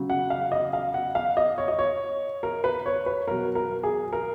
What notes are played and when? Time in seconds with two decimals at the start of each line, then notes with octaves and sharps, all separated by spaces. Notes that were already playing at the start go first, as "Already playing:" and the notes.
Already playing: C#3 F#3
0.10 F#5
0.30 F5
0.52 D#5
0.73 F5
0.94 F#5
1.15 F5
1.37 D#5
1.58 C#5
1.68 D#5
1.79 C#5
2.43 A#4
2.64 B4
2.86 C#5
3.06 B4
3.28 B2 F#3 A#4
3.55 A#4
3.83 G#4
4.13 A#4